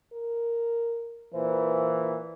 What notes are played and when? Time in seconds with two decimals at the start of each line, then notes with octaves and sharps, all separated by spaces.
0.13 A#4
1.35 A#2 E3 C5